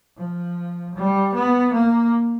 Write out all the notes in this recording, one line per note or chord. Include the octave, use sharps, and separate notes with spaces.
F3
G3
B3
A#3